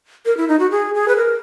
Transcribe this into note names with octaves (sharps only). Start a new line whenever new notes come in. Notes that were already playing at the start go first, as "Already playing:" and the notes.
A#4
E4
D#4
F#4
G#4
G#4
B4
A#4